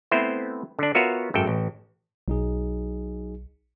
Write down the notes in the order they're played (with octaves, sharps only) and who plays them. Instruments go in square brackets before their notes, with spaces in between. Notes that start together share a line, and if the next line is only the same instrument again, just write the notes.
[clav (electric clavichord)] A3 B3 C4 E4 C5
D3 D4
B3 F4 F#4 A#4 C#5 E5
G#1 F#2 A4 G5
A1
[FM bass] B1 [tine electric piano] F#3 D#4 G#4